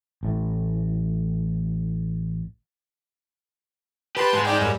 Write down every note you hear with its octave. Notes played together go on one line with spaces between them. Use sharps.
A1 A2
G4 B4 A5 C6
G#2 G#3
D#4 D5 G5
F#2 G3